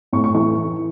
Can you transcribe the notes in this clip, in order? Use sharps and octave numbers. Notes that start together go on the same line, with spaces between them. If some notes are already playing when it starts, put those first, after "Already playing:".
A2 C#6
C#6
E3 C#6